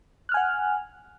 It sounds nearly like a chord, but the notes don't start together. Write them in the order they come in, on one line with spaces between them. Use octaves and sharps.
F#6 F6 G#5 F#5